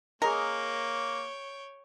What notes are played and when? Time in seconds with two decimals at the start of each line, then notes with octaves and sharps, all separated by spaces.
0.22 A#3 G#4 A#4 C#5 D#5 G5 A#5